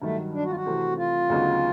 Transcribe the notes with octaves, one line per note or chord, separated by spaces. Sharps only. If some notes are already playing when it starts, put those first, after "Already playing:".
G2 D#3 F#3 A3
D4
F#4
F4
F#4
C3 E3 A3 C4
F4
D2 C#3 F#3 B3 D#4